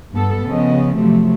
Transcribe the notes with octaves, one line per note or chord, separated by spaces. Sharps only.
G2 B3 A4
C#3 F3 B3 D#5
C3 F3 F#3 A3